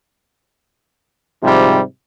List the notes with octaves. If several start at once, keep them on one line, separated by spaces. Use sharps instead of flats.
G#2 C3 F3 G3